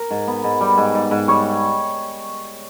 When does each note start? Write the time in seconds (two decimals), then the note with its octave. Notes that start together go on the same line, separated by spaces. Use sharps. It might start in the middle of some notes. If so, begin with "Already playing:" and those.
Already playing: A#4
0.11 G#2
0.28 B3
0.44 G#2
0.61 G3
0.78 G#2
0.95 G#2
1.11 G#2
1.28 G3 C#5